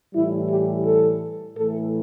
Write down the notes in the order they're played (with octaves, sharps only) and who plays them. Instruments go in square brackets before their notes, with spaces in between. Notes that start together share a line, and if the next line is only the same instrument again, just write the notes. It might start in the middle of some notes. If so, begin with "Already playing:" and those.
[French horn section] A2 E3 G3 E4
G4
A4
A2 E3 A3 A4